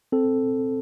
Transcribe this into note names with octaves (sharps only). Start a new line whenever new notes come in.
C4 A4